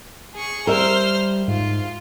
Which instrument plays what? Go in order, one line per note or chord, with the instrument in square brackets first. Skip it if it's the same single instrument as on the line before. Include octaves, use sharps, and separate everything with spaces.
[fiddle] G#4 C#6
[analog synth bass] G3 [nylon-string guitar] A#4 E5 [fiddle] C5 F6
[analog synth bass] G#2 [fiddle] F4